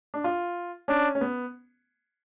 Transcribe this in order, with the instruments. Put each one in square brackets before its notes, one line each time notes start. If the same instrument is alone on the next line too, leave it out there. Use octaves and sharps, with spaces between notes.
[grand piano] D4
F4
[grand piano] C#4 [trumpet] D4
[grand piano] C#4
B3